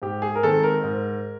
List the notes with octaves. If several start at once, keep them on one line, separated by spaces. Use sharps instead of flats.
G#2 G4
G#4
A#4
D#3 G#3 C4 A4
A#4
G#2